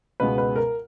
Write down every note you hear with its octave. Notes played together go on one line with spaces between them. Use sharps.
C#2 B2 G#3 B3 B4
B4
A#4